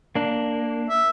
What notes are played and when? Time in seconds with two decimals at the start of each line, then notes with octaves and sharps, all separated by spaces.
0.15 A#3 D4
0.89 E5